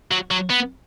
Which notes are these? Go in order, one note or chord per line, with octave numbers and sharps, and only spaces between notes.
F#3
F#3
B3